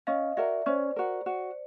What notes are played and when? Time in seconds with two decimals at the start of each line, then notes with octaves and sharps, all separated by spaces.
0.07 C#4 D#5 F5
0.37 F#4 A#4 D5 E5
0.66 C#4 C5 D5
0.96 F#4 A#4
1.26 F#4